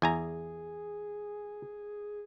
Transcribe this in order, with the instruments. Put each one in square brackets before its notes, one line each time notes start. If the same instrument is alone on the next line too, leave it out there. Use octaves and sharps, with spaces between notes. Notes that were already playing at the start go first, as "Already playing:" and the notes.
[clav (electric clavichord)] E2 G#5 A#5 [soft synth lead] G#4